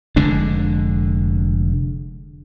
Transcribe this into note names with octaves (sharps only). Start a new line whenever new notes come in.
F1 D3 G#3 D4